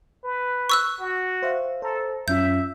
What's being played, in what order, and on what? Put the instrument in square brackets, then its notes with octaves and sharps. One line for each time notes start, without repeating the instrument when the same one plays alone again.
[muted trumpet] B4
[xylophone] C#6 E6 F#6
[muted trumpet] F#4
[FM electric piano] C5 E5 F5
[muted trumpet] A4 [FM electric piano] C5 A#5
[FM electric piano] F#2 C#4 F4 [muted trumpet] E5 [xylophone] G6